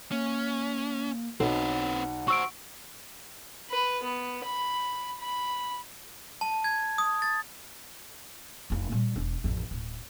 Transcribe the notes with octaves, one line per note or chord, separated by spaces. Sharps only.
A#3 C#4
B1 C4 B4 F#5
F#4 C5 C#6 E6 D7
B4
B3
B5
B5
A5
G#6
D#6
A6
F1 F4
A#2 G3
E1 D4
A1 F2
D1